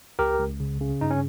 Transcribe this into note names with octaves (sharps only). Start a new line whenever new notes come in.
C#2 G4 A#4
C#2
C#3
C#3
G2 D#4
C#4